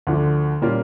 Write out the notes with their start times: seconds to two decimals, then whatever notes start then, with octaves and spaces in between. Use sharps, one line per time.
0.07 D2 D3 F3
0.61 A#2 G3 A#3 C#4 F4